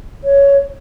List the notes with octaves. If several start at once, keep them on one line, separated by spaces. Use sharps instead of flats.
C#5